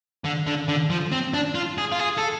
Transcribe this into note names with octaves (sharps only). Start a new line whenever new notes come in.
D3
D3
D3
F3
C4
D4
F4
G#4
F4
G#4
A4